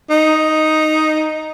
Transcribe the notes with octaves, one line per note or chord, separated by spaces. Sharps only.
D#4